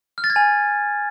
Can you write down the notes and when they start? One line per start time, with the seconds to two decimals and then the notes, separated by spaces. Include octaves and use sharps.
0.18 F6
0.24 A6
0.30 G#6
0.36 G#5